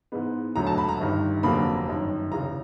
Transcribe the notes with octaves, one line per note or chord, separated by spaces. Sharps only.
G#2 E3 G#3 B3
E1 D2 D3 F#3 A3 A#5
A5
B5
A#5
G1 G2 D#3
F1 F2 D3 F#3 A#3 B5
G1 F#2 D#3
F1 D#2 C#3 E3 A#5